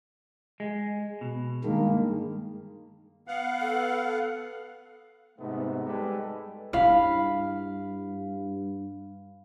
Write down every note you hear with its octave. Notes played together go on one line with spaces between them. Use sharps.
G#3
B2
G2 D#3 G#3 A#3
B3 F5 F#5
A4
G#2 C3 A3 B3 D#4
G3 G#3 G4 A4 B4
G2 E4 F5 B5 F6